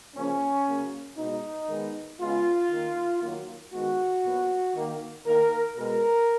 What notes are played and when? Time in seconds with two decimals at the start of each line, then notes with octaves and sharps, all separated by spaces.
0.16 C#3 F3 A#3 C#4
0.67 C#3 F#3 A#3
1.18 B2 G#3 B3 D#4
1.69 D#3 G#3 B3
2.20 C#3 G#3 B3 F4
2.71 D#3 A#3
3.22 D#3 F#3 A#3
3.73 D#3 G#3 B3 F#4
4.24 A#2 F#3 B3
4.76 D#3 A#3
5.26 D#3 A#3 A#4
5.77 B2 G#3 B3 A#4